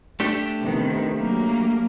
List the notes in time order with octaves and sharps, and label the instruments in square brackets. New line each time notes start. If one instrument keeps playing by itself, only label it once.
[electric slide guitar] A3 D4 G4
[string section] C3 D#3 B3
F#3 A#3